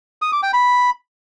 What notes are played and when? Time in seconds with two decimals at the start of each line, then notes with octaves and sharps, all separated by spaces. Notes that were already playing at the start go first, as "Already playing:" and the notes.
0.22 D#6
0.32 D6
0.43 G5
0.53 B5